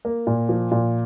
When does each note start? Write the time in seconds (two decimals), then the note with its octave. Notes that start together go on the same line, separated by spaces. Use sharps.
0.05 A#3
0.27 A#2
0.49 F3
0.72 A#2